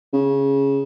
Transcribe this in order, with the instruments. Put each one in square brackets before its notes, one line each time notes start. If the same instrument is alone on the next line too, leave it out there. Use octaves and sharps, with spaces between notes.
[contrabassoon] C#3